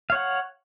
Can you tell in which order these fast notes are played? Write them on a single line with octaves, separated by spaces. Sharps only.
F5 C#5 F#5